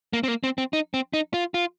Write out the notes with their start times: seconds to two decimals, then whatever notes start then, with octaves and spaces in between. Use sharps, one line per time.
0.13 A#3
0.24 C4
0.28 A#3
0.44 C4
0.58 C4
0.73 D#4
0.94 C4
1.14 D#4
1.34 F4
1.54 F4